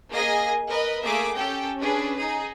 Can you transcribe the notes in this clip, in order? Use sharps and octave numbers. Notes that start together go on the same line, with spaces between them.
A#3 G#4 D#5 G#5 A#6
A#4 B4 D#5
A3 A#3 G#4 E5 D6
C#4 G4 A4 G5
C#4 D4 G#4 B4
D#4 G#4